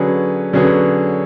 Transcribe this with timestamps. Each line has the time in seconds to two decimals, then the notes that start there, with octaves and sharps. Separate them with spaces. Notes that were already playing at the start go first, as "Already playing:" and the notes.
Already playing: D3 F#3 C#4 G#4 B4
0.53 D3 F#3 C#4 G#4 B4